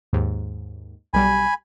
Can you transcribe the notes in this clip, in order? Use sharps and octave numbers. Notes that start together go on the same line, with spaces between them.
D#2 G#2
B1 G3 G#5 B5